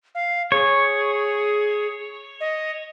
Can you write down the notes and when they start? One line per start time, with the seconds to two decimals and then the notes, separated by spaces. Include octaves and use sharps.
0.15 F5
0.52 G#4 C#5
2.40 D#5